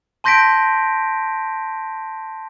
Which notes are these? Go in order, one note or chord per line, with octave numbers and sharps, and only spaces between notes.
A5 C6 G6 A#6 B6 D7